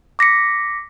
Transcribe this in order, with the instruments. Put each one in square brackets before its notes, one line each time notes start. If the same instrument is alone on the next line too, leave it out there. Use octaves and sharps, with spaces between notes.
[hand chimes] D6 A#6 B6 C#7